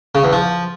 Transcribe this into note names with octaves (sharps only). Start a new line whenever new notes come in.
C#3
E2
F3